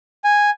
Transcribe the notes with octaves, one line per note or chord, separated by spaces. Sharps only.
G#5